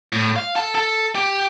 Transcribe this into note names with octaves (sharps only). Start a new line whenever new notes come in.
A2
F5
A4
A4
G4